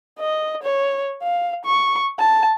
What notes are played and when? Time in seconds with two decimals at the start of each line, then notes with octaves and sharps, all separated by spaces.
0.19 D#5
0.63 C#5
1.22 F5
1.65 C#6
2.19 A5